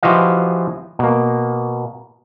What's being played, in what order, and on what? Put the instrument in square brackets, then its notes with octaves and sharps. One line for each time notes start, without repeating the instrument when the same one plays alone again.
[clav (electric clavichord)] E3 F3 F#4 G4 D#5 F5
B2 A#3